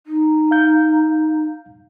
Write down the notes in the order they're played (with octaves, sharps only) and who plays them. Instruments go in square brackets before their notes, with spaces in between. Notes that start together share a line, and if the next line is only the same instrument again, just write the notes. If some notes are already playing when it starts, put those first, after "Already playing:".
[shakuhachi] D#4
[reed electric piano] F5 G6